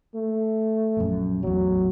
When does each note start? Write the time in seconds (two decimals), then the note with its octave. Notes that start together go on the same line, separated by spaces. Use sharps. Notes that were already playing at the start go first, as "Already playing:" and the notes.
0.15 A3
0.97 A#1 F#2
1.43 A1 E2 F#3